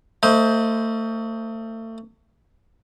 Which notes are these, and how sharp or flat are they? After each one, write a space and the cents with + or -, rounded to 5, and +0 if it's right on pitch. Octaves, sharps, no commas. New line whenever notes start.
A3 +35 C5 +0 D#5 +35